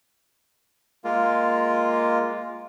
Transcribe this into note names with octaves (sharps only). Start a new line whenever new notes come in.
G#3 A#3 F4